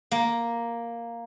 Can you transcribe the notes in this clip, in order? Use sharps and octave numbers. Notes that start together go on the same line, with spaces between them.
A#3